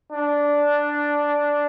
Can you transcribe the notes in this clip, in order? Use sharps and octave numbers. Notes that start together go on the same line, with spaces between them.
D4